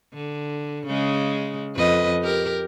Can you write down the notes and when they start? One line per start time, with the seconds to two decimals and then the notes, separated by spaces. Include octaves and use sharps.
0.14 D3
0.87 C#3 G#3
1.75 F2 B4 D#5
2.22 G4 A#4